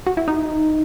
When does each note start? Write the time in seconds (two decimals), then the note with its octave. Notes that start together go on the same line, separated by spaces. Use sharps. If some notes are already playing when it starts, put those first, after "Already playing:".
0.07 F#4
0.17 E4
0.28 D#4